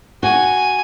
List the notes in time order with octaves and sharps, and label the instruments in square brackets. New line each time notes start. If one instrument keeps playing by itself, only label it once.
[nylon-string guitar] F#4 [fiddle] G#5